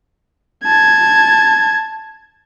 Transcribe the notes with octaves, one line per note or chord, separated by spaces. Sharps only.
A5 G#6